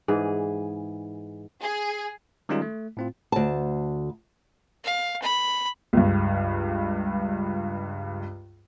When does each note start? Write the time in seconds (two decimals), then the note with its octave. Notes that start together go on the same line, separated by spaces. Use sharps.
0.08 G#2 E3 G#4
1.62 G#4
2.49 D#3 G3 G#3 C#4 D#4 F4
2.62 A3
2.97 A2 C4 F4
3.32 D2 A5
4.84 F5
5.22 B5
5.93 C#2 G2